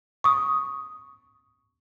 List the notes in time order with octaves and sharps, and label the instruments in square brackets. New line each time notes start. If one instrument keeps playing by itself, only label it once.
[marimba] C#6 D#6